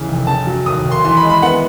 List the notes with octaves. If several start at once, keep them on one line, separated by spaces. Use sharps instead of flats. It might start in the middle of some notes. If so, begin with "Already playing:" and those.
Already playing: D#2 C#3 E3
F1
C#3 A5
F#3
D#2 D#6
D#2
C6
E3 C6
B5
G#3
B5
B3 F#5